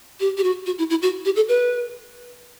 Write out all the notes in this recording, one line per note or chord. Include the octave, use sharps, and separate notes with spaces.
G4
G4
F#4
F#4
E4
E4
F#4
G4
A4
B4